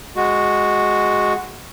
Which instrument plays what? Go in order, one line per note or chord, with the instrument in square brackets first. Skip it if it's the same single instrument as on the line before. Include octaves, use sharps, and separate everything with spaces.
[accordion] G#3 F#4